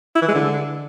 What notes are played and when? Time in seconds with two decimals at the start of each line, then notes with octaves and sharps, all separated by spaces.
0.15 E4
0.22 E3
0.28 G#3
0.34 D3